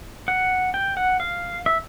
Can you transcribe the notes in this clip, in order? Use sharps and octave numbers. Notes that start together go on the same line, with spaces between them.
F#5
G5
F#5
F5
E5